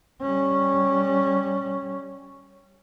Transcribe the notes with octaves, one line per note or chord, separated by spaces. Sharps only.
G3 C#4